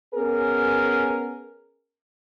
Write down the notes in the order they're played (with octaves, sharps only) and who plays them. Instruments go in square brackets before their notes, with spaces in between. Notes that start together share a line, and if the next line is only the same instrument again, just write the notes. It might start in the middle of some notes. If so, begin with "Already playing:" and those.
[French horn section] B3 C#4 G#4 A#4